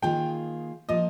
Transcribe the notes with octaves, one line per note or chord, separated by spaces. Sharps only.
D#3 A#3 F4 G#4 G5
F3 A#3 F4 D#5